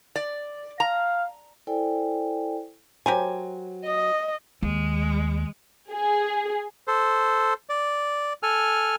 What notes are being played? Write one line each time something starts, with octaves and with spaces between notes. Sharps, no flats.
D5
F5 A#5
E4 A4 C5 D5 G5 G#5
F#3 G4 A#4 C5 G#5
D#5
D#2 G#3
G#4
A4 C5
D5
A4 G#5 F6